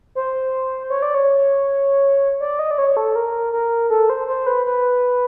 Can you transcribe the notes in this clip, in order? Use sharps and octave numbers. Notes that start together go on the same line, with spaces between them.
C5
C#5
D5
C#5
D5
D#5
D5
C#5
A4
A#4
A#4
A4
C5
C5
B4
B4